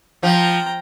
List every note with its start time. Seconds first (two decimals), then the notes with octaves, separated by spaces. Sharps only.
0.23 F3 G5 A#5